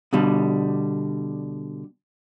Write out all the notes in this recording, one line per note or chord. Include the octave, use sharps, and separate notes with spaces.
B2 D3 G3